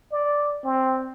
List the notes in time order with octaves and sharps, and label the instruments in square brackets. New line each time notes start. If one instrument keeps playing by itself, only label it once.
[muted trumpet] D5
C4